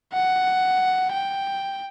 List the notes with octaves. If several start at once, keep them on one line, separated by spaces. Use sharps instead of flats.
F#5
G5